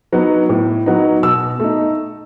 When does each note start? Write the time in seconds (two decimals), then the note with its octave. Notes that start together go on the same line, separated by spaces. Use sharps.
0.13 F#3 B3 D#4
0.49 A2
0.86 F#3 B3 D#4
1.23 B2 E6
1.60 A3 D#4